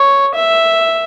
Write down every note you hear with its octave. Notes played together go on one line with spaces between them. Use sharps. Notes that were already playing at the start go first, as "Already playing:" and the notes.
Already playing: C#5
E5